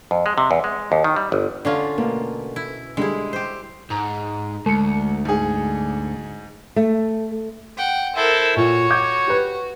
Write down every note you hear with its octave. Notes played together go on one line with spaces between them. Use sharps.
F2
G#3
C3
E2
G#3
D#2
D#3
G3
G1
D3 C#4 D4 F4 F5
B2 A3 A#3
E4
D3 G3 G#3 E4 G#4
G4 C5
G#2 A#5
D2 G#3 C#7
G#2 G#4
A3
F#5 G5
E4 A4 A#4 C5 E5
A#2 F#4 C#5
D6 G6 G#6
G4 B4